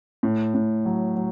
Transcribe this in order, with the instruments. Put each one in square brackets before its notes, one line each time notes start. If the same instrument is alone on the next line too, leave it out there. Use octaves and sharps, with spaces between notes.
[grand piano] A2
A2
F#3
F#3